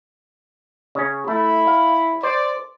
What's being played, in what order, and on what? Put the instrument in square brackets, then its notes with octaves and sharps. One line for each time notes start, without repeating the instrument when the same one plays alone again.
[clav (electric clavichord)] C#3 C#4
[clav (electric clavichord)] A3 [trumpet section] E4 B5
[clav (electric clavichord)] F5
[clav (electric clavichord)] C5 [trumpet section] D5